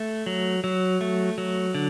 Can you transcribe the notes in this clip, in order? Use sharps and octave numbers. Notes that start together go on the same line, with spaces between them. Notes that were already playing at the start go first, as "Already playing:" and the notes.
Already playing: A3
F#3
F#3
A3
F#3
D3